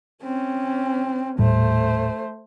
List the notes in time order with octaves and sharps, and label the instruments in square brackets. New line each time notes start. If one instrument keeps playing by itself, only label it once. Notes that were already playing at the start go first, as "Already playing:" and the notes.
[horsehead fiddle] C4 C#4
[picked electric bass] D#1 A2 G3 [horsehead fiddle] A3 C5